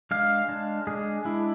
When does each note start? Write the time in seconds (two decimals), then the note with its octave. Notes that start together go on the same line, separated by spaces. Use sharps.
0.11 G#3 D4 F5
0.48 G#3 D4
0.87 G#3 D4 G#4
1.25 G#3 D4 E4